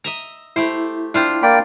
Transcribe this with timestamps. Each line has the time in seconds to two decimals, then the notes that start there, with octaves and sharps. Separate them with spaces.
0.04 D#5 E5 A#5
0.56 A3 E4 G4 C5
1.14 D4 E4 F4 C5 G5
1.43 A#3 D5 G5 B5